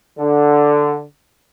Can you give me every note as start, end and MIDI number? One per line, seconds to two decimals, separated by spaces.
0.19 1.04 50